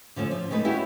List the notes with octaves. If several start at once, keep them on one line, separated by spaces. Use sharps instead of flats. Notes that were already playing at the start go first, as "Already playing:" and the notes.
D3 F3 A3 C#4
F3
G#3 A3 D#4 B4
C#4 E4 F#4 G4